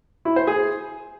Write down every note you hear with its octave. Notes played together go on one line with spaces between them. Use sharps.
E4
C5
G#4